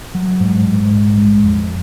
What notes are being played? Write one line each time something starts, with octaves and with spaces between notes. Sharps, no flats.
F#3
G#2
G#2
A#1
G#3
F2